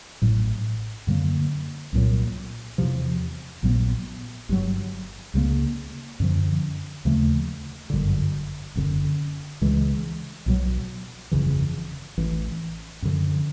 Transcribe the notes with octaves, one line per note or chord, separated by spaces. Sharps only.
A1 A2 F#3
F#2 D3 F#3 A#3
C2 A#2 F#3
E2 C3 F3
A#1 A#2 F#3 B3
G1 G2 D3 F#3
C#2 C#3 F3 A#3
F#2 D3 F3
D#2 C#3 F3 A3
G1 F#2 D3
F#1 F#2 D3
C#2 C#3 E3 G#3
B1 B2 F#3
G1 F2 C#3 E3
A1 A2 E3
F#2 D3 F3